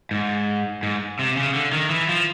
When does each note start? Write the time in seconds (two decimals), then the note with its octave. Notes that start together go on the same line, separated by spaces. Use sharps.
0.11 G#2
0.83 G#2
1.19 C3
1.37 C#3
1.55 D3
1.73 D#3
1.90 E3
2.09 F3